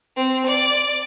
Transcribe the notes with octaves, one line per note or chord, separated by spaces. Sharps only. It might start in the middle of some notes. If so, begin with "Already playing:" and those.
C4
D5